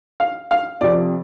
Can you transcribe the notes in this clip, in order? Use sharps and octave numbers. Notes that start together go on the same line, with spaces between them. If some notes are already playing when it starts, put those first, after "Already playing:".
F5
F5
F2 C3 F3 D5